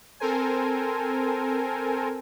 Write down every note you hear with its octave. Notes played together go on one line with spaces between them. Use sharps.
C4 A4 A#4 C5 G#5